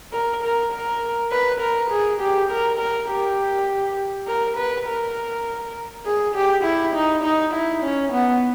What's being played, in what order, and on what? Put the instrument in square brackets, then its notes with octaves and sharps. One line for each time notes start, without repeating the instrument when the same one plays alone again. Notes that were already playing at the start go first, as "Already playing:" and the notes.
[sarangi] A#4
A#4
A#4
B4
A#4
G#4
G4
A#4
A#4
G4
A#4
B4
A#4
G#4
G4
E4
D#4
D#4
E4
C#4
B3